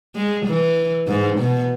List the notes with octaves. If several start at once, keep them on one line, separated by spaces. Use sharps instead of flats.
G#3
E3
G#2
B2